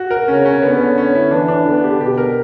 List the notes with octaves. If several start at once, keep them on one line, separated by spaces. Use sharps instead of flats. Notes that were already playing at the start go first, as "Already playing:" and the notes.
Already playing: F#4
A#4
C#3 C#4
C#4
D3 B3
C#4
C#4
E4
E3 D4
D4
D3 B3
G4
B2 G4
A#4